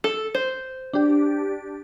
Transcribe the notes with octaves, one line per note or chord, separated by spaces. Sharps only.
A4
C5
D4 G4